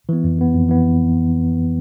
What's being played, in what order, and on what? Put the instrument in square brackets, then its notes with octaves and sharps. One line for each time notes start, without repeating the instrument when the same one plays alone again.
[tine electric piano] E3 B3
F2
E3 B3
F2
E3 B3